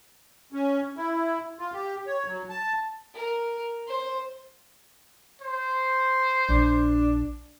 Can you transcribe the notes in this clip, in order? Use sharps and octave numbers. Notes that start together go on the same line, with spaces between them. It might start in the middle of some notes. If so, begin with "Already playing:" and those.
C#4
E4
F4
G4
C#5
F#3
A5
A#4
C5
C5
A#1 D4